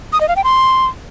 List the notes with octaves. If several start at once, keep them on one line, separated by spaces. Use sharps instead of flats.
D#6
D#5
F5
G5
C6